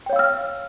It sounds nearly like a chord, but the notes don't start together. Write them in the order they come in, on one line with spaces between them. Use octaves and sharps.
G5 C#5 F5 E6 F6